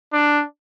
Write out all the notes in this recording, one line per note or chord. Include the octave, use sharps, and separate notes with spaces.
D4